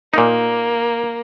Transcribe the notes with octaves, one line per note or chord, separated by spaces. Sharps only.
A#2 A#3 D#4